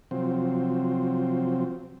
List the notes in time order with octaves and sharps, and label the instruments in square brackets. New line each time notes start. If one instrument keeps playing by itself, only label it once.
[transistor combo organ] C3 F3 F#3 C4